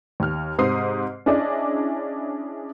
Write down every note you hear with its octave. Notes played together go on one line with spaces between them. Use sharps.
D#2 F6
G#2 C3 C5 D#6 C7
C#4 D4 E4 G#4 D5 D#5